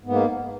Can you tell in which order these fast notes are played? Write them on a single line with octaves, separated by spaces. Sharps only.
G#2 B3 A#3